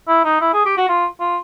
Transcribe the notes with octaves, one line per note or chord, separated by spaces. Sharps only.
E4
D#4
E4
G#4
G4
F#4
F4
F4